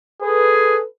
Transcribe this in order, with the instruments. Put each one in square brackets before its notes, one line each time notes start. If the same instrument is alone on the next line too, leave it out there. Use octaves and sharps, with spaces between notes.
[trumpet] G#4 [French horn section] A4 B4